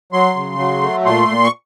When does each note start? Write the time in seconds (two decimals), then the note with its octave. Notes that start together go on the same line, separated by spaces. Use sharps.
0.12 F#3 C6
0.36 C#3
0.58 F#3
0.82 A3
1.05 A#2 C6
1.28 A#2
1.44 C#6